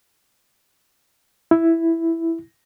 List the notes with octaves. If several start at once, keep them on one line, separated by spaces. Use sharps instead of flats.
E4